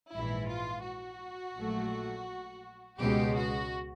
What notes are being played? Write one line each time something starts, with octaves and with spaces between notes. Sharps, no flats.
A#1 G#2 E3 E4
F4
F#4
A#1 A#2 F#3 A3
C#2 B2 G#3 G4
F#4